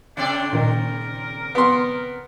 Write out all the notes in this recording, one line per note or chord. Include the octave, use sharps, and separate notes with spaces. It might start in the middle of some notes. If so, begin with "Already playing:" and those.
C#3 C4 D4 D5
A#2 D#3 A#4
B3 C6